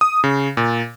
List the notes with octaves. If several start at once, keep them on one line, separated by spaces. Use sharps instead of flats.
D#6
C#3
A#2